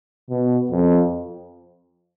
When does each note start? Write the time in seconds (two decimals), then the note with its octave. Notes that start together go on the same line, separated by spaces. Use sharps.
0.30 B2
0.71 F2